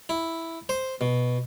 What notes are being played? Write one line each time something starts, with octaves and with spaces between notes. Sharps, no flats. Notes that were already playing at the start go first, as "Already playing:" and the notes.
E4
C5
B2